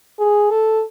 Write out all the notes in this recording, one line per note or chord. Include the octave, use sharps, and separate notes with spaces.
G#4
A4